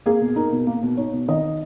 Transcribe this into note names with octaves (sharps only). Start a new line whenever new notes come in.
A#3 G#4
B2
D#4 A#4
B2
A#3
B2
D#4 C#5
B2
D#3 D#5